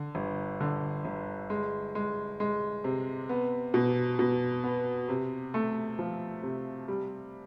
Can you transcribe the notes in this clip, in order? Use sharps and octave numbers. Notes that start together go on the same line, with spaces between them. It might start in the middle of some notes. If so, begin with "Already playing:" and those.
Already playing: D3
G1
D3
G1
G#3
G#3
G#3
C3
B3
B2
B2
B3
C3
A3
F3
C3
G3